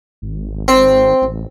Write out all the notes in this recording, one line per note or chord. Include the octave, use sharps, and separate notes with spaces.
G#1
C4
A1